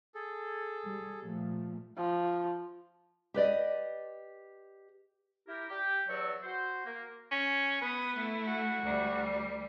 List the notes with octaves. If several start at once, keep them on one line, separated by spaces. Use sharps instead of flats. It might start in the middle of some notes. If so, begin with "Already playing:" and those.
G#4 A4
G3
A#2 F3 A3
F3
G4 B4 D5 D#5
E4 G4 A#4
G4
E2 F#3 D5 C#6 E6
F#4 C5
A#3
C#4
B3 B4 D#6
A3 E4
F#4
D2 G3